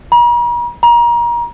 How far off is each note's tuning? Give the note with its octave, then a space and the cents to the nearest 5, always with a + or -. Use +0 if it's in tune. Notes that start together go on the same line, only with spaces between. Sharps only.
A#5 +45
A#5 +30